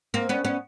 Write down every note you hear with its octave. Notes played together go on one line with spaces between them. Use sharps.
A#3 C4
B3 C#4
B3 C#4